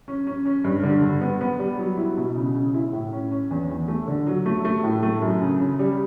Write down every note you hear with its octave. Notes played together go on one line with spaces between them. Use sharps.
C#4
C#4
C#4
G2
D3
G2
B3
B3
G3
F#3
E4
B2
C#3
C#3
E4
A2
C#4
C#4
E2
E2
A3
D3
F#3
A3
A3
A2
A3
F#2
C#3
C#3
G3